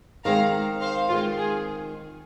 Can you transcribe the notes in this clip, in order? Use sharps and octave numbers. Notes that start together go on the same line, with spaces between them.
D#3 G#3 C4 F5 A#5
C5 F5
D#3 G#3 C4 F4
G#4